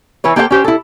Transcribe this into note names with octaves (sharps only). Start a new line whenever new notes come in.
E3 E4 B4 C#5
A#3 G4 A4 C5 C#5 G5
C#4 G4 C5
E4 A4